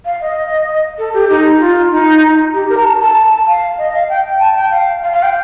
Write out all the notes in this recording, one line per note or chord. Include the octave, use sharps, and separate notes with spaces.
F5
D#5
A4
G4
D#4
F4
D#4
G4
A#4
A#5
A5
A5
F5
D#5
F5
G5
A5
G5
F5
F5
F5
G5